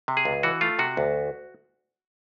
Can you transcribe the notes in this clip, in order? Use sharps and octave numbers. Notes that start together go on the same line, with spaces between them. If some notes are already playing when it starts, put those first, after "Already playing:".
C3
G#4
C#2
E3 F#4
A3 F4
C3 F#4
D2